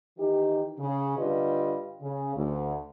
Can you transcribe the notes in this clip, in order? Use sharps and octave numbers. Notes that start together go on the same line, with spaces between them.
D#3 E3 D#4 G4
C#3
G2 D3 G3 F4 B4 D#5
C#3
D2